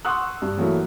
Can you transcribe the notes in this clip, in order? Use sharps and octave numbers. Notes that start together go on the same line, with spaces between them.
F#5 C6 C#6 D#6 E6 F#6
G2
E3 F#3 A3 A#3 E4